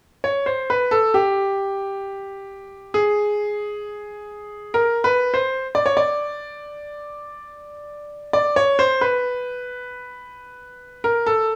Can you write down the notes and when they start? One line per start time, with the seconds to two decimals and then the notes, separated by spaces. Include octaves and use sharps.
0.24 C#5
0.46 C5
0.70 B4
0.91 A4
1.14 G4
2.94 G#4
4.74 A#4
5.04 B4
5.34 C5
5.75 D5
5.86 C#5
5.97 D5
8.33 D5
8.56 C#5
8.79 C5
9.01 B4
11.04 A#4
11.26 A4